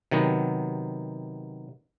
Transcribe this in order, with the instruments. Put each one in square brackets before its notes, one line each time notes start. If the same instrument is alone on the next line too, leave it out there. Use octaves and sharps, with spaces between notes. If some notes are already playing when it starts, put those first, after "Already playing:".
[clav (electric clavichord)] C3 D#3 F#3 B3